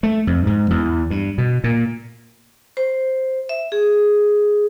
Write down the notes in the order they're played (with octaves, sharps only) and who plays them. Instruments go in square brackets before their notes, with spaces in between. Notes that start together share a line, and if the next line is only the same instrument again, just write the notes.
[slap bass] A3
F2
G#2
E2
G2
B2
A#2
[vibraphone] C5
E5
G#4